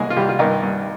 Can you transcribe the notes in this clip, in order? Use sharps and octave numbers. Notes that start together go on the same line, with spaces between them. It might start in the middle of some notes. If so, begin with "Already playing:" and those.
Already playing: C2 G#3 A#3 G#4
F4
C2 G3 G4
F4
G2 D#3 D#4
G2